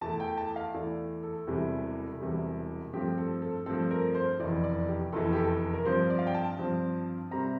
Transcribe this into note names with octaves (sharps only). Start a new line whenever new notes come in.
E2 E3 A3 A5
G5
A5
F5
E2 E3 A3 D5
A4
E1 E2 C3 E3 G3
E1 E2 C3 E3 G3
G2 F3 A3 C4 G4
A4
A4
G2 F3 A3 C4 A4
A#4
C5
F1 E2 E3 D5
D5
G4
F1 E2 E3 A4
G4
A4
A#4
G2 F3 C4 C5
D5
F5
G5
A5
G2 F3 C4
C3 G3 C4 A#5